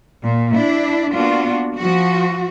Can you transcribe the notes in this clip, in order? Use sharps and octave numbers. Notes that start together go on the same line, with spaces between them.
A#2
D4 E4
A#3 B3 D4 F4 F#4
F3 F#4